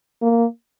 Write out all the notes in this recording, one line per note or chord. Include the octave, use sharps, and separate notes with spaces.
A#3